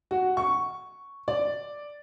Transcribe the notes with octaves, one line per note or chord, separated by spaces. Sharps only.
F#4
C#6
D5